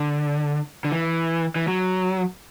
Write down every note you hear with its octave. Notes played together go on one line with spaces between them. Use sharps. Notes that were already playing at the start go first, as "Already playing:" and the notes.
Already playing: D3
D3
E3
E3
F#3